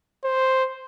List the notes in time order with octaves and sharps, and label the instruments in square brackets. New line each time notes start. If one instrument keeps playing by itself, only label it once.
[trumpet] C5